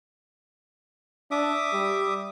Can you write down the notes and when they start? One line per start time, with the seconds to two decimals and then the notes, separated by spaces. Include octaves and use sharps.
1.31 D4 E5 D6 D#6
1.73 G3